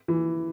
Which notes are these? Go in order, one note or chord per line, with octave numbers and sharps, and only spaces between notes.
E3